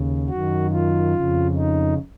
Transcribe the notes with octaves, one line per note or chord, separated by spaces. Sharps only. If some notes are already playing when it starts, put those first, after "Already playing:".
Already playing: D#2 C#3
F#2 D#3 F#4
F4
F2 C#3
D#4